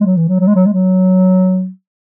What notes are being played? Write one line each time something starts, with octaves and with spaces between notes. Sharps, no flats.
G#3
F#3
E3
F#3
F#3
G#3
F#3
G#3
F#3